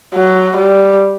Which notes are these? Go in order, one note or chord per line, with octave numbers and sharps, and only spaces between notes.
F#3
G3